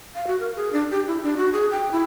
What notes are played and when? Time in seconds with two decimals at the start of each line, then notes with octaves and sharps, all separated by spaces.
0.15 F5
0.27 F#4
0.40 A#4
0.56 G#4
0.72 D4
0.91 G4
1.07 E4
1.23 D4
1.37 F#4
1.53 G#4
1.71 G5
1.92 E4